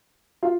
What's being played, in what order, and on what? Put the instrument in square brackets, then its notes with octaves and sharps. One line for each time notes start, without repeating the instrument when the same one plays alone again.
[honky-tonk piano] F4